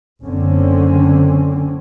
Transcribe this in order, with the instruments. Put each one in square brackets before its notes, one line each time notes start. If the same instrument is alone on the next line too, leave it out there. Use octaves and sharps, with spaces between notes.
[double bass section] F#1 D3 C4 C#4